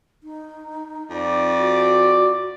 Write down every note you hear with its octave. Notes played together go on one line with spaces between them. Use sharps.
D#4
F2 D5
F#4